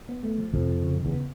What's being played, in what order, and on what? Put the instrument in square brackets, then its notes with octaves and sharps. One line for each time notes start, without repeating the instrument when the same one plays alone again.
[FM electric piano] B3
A3
F3
[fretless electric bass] F2 [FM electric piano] C3
[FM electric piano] F3
C#3
C#3
[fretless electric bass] E2
[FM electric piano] B3